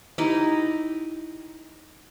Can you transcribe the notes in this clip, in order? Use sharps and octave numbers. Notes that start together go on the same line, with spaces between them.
D#4 E4 G4 D#5